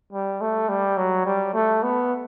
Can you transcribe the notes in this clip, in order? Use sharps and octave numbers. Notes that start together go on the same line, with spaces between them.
G3
A3
G3
F#3
G3
A3
B3